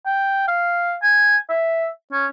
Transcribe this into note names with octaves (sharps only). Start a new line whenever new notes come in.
G5
F5
G#5
E5
C#4